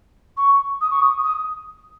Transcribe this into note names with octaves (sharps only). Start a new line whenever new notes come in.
C#6
D#6
C#6
D#6
D#6